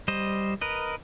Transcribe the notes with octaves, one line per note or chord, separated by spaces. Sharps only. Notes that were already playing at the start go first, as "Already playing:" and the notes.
G3 C5 D#5
A#4 B4 D#5